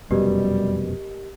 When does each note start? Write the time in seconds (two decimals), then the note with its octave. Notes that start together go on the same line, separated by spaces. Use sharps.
0.11 F1 F#2 B2 G3 G4 A#4 D#5